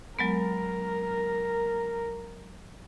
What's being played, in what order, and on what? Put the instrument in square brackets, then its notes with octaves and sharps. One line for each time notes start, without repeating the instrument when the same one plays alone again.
[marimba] F#3 G#3 B3 [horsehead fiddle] A#4